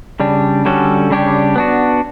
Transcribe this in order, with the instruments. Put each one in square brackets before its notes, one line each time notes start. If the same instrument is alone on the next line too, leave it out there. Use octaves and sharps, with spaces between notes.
[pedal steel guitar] C#3 G3 D4
D3 G3 C#4 F#4 A4
C#3 G3 D4 G4 C#5
B3 D4 F#4